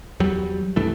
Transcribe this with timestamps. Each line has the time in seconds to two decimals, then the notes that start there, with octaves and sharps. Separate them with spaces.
0.20 E2 F#3 G3
0.76 C2 G2 E3 A3